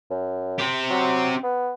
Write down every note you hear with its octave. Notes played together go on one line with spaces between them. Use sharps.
F#2
C4 G4
F#3
B3